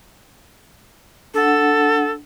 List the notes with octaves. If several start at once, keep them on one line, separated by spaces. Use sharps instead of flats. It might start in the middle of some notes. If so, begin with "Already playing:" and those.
D4 A4 F#5